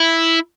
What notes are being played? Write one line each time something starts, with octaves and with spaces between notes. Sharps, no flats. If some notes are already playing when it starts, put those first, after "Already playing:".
Already playing: E4